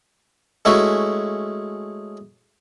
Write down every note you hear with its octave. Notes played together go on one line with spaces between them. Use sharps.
G#3 A3 C#4 E4 F#4